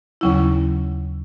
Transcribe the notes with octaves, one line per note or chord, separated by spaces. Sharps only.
D#2 C#3 F#3 C#4 E4